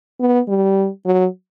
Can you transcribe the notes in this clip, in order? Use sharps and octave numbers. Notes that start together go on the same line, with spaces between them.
B3
G3
F#3